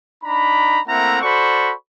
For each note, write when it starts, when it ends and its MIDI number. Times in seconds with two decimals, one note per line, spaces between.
0.24 0.80 62
0.24 0.80 63
0.24 0.80 82
0.24 0.80 83
0.87 1.21 57
0.87 1.21 58
0.87 1.21 60
0.87 1.21 64
0.87 1.21 78
0.87 1.21 82
1.22 1.73 66
1.22 1.73 69
1.22 1.73 72
1.22 1.73 74
1.22 1.73 83
1.22 1.73 85